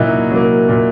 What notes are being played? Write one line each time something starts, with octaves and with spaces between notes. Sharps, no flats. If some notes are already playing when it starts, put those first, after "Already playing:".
Already playing: A#2 F#3 A#3 D#4 E4 F#4
F#3 A#3
A#2